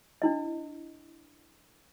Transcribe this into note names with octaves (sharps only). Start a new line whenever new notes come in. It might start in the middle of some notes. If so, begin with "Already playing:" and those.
D4 E4 D#5